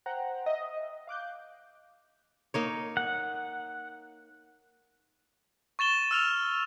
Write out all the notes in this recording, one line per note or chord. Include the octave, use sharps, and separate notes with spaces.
C5 F#5 G5 A#5
D#5 E5
F5 D6 F#6 G6
A#3 D#4 C#5
F#5
C#6 A6 E7 G7
E6 F6 F7